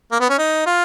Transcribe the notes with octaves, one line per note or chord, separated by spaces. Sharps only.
A#3
B3
C#4
D#4
F4